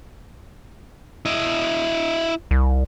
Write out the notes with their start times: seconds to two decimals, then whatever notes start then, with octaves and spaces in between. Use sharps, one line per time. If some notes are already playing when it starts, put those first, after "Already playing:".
1.25 E4 D#5
2.51 C2